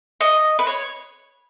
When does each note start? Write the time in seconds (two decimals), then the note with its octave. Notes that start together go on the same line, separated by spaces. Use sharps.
0.21 D#5
0.59 B4
0.67 C#5